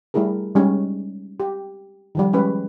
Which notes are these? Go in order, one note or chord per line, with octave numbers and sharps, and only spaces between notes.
G3 A3 E4 G#4 A#4
G3 G#3 C#4 D#4
G4
D#3 F3 G3
G3 G#3 C#4 G4 B4